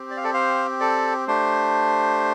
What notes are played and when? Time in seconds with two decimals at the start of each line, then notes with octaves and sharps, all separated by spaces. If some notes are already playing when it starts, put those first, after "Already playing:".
Already playing: C4 G4
0.10 D5
0.17 F5
0.24 A4 D5
0.34 C5 F5
0.80 A4 D5
1.27 A3 D4 G4 C5